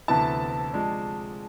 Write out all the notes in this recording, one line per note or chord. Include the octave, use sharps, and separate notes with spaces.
D2 C3 E3 B3 E4 A5
C3 F3 G#3 D4